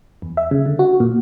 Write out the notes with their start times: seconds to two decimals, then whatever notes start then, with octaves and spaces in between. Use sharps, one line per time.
0.22 E2
0.37 E5
0.51 C#3
0.66 D3
0.79 F#4
1.00 A#2